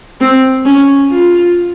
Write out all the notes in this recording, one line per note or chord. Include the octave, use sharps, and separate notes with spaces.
C4
C#4
F4